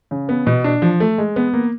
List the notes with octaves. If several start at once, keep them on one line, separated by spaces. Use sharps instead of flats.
C#3
B3
B2
D4
F3
A3
G#3
B3
A#3